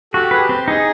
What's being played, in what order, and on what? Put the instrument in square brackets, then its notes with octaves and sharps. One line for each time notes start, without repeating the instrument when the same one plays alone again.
[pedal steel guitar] F#4 [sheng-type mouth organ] G4 A4
[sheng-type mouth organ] G#4 [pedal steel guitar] B4
[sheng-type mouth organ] G4
[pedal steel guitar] C4
[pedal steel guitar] D#4 [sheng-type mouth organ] G#4